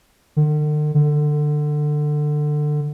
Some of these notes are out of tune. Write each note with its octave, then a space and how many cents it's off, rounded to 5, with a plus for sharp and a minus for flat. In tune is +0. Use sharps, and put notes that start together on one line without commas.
D3 +45
D3 +20